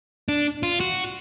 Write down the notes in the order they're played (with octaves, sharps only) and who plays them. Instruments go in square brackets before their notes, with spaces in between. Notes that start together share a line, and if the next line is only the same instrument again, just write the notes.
[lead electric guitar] D4
F4
F#4